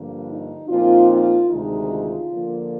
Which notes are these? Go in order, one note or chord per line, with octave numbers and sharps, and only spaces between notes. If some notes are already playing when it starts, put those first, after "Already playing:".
Already playing: G2 D3 F3 A#3
D#4
A#2 F3 C4 D#4 F4
F4
D2 C3 D#3 G#3 D#4
F4
D3 F3 A#3